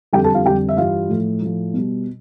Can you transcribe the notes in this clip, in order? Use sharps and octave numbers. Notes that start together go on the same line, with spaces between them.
F2 D3 G3 G4 G5
A4 A5
F4 F5
F2 D3 G3 G4 G5
E5
G2 E3 G3 F4 F5
A2 F3
A2 F3
B2 G3